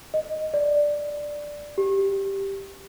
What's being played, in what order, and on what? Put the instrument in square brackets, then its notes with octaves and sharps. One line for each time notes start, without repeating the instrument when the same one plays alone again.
[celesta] D#5
D5
G4